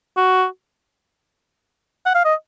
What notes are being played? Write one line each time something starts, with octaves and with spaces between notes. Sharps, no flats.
F#4
F#5
F5
D#5